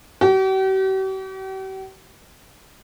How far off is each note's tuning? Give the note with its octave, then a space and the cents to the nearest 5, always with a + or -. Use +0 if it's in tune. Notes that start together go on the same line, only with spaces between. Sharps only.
G4 -45